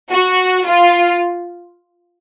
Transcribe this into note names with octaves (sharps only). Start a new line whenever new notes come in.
F#4
F4